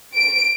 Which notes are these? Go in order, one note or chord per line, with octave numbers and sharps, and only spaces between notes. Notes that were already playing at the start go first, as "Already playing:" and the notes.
D7